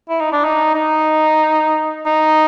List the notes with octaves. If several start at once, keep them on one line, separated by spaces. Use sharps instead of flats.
E4
D#4
D4
D#4
D#4
D#4